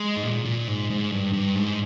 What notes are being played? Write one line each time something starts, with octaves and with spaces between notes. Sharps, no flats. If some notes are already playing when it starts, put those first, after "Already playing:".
Already playing: G#3
G#2
A#2
A#2
G#2
G#2
G2
G2
G#2